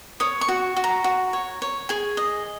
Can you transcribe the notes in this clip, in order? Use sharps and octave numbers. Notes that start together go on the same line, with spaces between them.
C#5 D#6
C#6
F#4
F#4
A#5
F#4
C#5
C#5
G#4 G#5
D#5